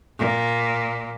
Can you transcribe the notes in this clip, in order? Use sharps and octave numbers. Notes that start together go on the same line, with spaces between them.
A#2